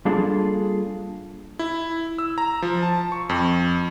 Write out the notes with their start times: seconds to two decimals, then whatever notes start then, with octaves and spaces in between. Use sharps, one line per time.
0.05 G3 A#3 D4 F4 G#4 A4
1.59 E4
2.18 E6
2.38 A#5
2.62 F3
2.82 A5
3.12 C#6
3.29 F2